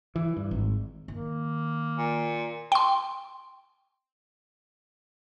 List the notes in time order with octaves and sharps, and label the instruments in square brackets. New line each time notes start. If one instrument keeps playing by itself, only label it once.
[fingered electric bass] E3
G2
G#1
[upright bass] D#3 [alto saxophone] A#3
[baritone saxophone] A#2
[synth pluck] G5 C6